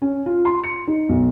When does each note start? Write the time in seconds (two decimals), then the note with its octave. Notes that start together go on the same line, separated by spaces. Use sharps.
0.02 C#4
0.26 F4
0.45 C6
0.64 C#7
0.87 D#4
1.09 B1